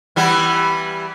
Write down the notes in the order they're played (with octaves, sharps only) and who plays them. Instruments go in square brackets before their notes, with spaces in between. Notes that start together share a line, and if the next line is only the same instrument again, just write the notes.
[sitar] E3 G3 B3